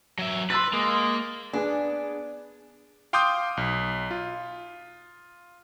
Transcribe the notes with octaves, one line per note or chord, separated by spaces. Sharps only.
F#3 E5
B4 C6 E6 A6
G#3 A#3
B3 D4 G#4
F5 G5 C6 D6 D#6 G6
B1
F4